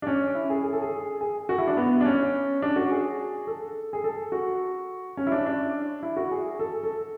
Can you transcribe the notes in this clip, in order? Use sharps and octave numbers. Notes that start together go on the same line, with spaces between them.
D4
C#4
E4
G#4
G#4
A4
G#4
G#4
F#4
E4
D4
B3
D4
C#4
D4
F#4
G#4
A4
G#4
A4
F#4
C#4
E4
D4
D4
E4
F#4
G#4
A4
A4